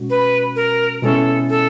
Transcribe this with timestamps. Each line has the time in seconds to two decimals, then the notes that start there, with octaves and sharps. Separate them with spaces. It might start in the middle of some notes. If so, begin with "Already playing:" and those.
Already playing: B2 G#3 C#4 F#4
0.10 B4
0.56 A#4
1.03 B2 G#3 C#4 E4 G#4 A4
1.49 A4